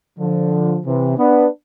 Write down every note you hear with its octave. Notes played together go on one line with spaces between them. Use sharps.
D3 F3
C3 E3
B3 D4